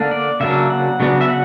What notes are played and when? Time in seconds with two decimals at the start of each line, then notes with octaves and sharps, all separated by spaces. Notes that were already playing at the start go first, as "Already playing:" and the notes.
Already playing: D3 A#3 D4
0.11 D5
0.40 C#3 F#3 A#3 D4 E5
0.70 F#5
1.00 C#3 F#3 B3 D4
1.21 E5
1.29 F#5